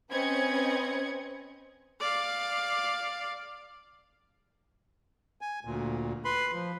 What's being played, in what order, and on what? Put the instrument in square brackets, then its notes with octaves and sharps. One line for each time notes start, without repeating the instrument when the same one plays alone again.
[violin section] C4 C#4 B4 D#5 G#6 C#7
[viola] D5 F5
[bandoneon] G#5
D2 A#2
B4 B5 C6
F3